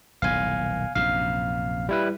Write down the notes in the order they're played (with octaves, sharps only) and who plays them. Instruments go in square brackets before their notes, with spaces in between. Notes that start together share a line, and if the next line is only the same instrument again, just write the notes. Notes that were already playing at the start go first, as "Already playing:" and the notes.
[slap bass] D#1 B1 A2 [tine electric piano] F5 G#5
[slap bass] A#1 F#2 C3 [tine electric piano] F5
[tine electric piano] G3 E4 B4